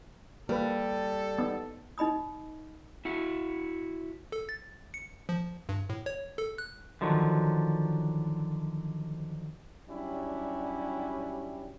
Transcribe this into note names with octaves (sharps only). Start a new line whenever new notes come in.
G3 A#3 A4 B4
B3 D#4
D#4 D#5 B5 D#6
E4 F#4
A4
A6
C#7
F3
G2
A2
C#5
A4
F#6
D3 D#3 F3 F#3
F#3 G3 C#4 D4 E4 G4